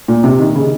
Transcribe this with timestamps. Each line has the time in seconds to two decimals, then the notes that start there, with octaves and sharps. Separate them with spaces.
0.08 A#2
0.24 C3
0.40 D#3
0.56 C#3